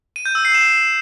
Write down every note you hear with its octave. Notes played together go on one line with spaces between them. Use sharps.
D#7
G6
E6
C7
E7